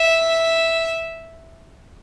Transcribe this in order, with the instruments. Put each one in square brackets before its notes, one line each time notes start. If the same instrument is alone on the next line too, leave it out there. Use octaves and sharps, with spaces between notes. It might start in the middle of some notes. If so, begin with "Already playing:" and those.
Already playing: [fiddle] E5